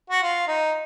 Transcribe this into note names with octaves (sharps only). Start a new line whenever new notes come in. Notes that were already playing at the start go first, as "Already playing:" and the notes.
F#4
F4
D#4